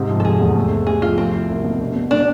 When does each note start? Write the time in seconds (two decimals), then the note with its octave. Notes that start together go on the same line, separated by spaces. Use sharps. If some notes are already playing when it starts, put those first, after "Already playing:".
Already playing: G#2 C3
0.10 F3
0.20 A4
0.24 F1 G#4
0.41 E2
0.55 A3
0.71 C4
0.87 C3 G#4
1.02 F3 F4
1.18 A3 C4
1.34 E4
1.49 C2
1.64 B2
1.80 D4
1.96 B2
2.11 B2 D4